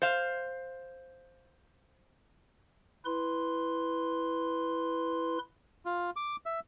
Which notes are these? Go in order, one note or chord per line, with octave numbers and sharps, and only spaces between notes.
C5 F5
E4 B4 C6
F4
D6
E5